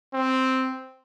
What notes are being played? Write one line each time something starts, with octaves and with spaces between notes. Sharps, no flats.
C4